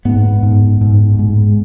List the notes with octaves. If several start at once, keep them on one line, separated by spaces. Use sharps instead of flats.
G#2 B3
G#2
G#2
G#2